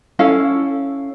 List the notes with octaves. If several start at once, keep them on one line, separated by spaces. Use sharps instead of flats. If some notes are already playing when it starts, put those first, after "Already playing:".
C#4 E4 A4 F5